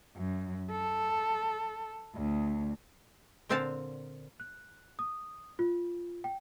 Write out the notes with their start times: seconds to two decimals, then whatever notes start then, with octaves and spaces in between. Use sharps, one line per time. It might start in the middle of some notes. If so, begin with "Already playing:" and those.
0.17 F#2
0.72 A4
2.15 D2
3.49 A#2 D3 C4 F5 F#5 A5
4.40 F#6
4.99 D#6
5.59 F4
6.24 G5